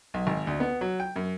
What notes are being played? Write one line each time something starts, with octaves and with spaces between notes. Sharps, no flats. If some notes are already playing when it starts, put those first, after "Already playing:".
B1
G#1
D2
B3
F#3
G5
F#2